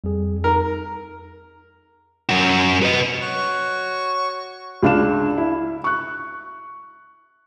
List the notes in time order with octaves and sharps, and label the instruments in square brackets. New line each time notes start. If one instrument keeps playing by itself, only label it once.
[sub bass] F2 [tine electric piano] G3 G#4
[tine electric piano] D#4 [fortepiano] A#4
[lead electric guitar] F#2 F#4
B4 D#5
[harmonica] F#4 C#5
[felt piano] C#2 D4 F5 E7
E4
C#6 F#6